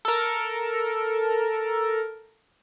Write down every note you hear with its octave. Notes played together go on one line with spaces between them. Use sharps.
A4 A#4